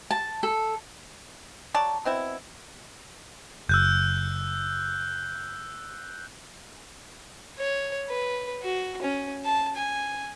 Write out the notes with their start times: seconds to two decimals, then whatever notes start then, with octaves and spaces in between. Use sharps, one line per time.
0.11 A5
0.43 A4
1.74 F#3 D5 A5
2.05 B2 C4 E4
3.69 F#1 E6 F#6 G6
7.59 C#5
8.10 B4
8.62 F#4
9.02 C#4
9.45 A5
9.76 G#5